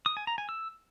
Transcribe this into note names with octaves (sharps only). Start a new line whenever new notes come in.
D#6
G#5
A#5
G#5
E6